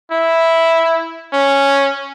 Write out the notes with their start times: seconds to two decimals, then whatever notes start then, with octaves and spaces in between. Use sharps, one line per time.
0.11 E4
1.33 C#4